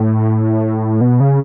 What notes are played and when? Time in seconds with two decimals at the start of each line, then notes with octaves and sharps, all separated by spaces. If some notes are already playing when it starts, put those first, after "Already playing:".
Already playing: A2
1.01 B2
1.20 C#3